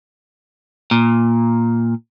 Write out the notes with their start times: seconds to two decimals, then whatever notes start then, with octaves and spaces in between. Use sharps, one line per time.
0.91 A#2